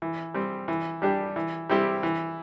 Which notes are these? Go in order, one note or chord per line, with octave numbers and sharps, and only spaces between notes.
E3
G3 C4
E3
G3 D4 G4
E3
G3 C4 E4 G4
E3